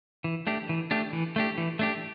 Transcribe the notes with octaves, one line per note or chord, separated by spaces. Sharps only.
E3
A3 D4 G4
E3
A3 D4 G4
E3
A3 D4 G4
E3
A3 D4 G4